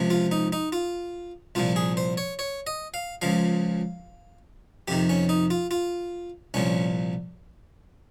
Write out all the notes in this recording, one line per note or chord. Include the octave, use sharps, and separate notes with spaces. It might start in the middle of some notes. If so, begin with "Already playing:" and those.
Already playing: C#2 C3 F3
F4
D#4
D#4
F4
C2 A#2 F3 F4
G#4
C5
C#5
C#5
D#5
F5
C#2 C#3 F3 F5
F2 C3 D#3 G4
C#4
D#4
F4
F4
C2 A#2 F3 C#4